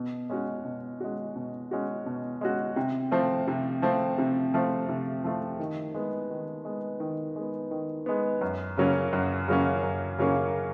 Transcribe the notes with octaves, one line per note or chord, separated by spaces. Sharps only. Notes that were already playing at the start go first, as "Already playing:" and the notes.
Already playing: B2
G#3 C#4 F#4
B2
G#3 C#4 F#4
B2
G#3 C#4 F#4
B2
G#3 C#4 F#4
C3
F3 A3 C4
C3
F3 A3 C4
C3
F3 A3 C4
C3
F3 A3 C4
D#3
G#3 B3
D#3
G#3 B3
D#3
G#3 B3
D#3
G#3 B3
F#2
C#3 F#3 A#3 C#4
F#2
C#3 F#3 A#3 C#4
F#2
C#3 F#3 A#3 C#4